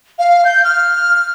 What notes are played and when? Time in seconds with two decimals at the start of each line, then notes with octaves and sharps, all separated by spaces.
0.19 F5
0.45 G6
0.64 F6